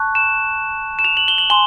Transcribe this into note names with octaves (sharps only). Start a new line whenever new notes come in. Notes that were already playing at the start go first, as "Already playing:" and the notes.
Already playing: A5 C#6 F#6
E7
E7
F7
F#7
G7
F#7
G#5 C6 G7